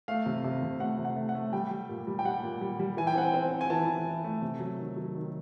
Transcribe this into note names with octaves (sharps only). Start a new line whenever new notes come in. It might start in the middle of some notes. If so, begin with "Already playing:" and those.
A3 F5
C3
C3
C3
A3 F#5
C3
F#5
A3
F#5
A3
G3 G5
G3
A#2
G3
G5
G3 F#5
A#2
G3
G3
E3 G#5
G5
C4 F#5
G5
C4
C4
G#5
E3 A5
E3
E3
A3
C3
F#3
D#3
F#3
D#3